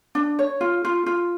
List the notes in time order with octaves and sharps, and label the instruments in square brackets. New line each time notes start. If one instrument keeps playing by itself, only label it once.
[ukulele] D4
C#5
F4
F4
F4